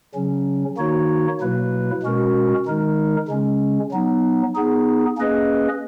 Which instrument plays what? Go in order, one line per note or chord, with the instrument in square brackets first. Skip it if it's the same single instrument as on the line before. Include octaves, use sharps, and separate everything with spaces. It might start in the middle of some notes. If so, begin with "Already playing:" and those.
[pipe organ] C#3 F#3 C#4
D#3 A#3 D#4 F#4 C#5
B2 F#3 A#3 E4 B4
B2 G#3 C#4 F#4 A#4
D#3 G#3 D#4 A#4
C#3 G#3 C#4
F#3 B3 D#4
B3 D#4 G#4
A#3 C#4 G#4 B4 D#5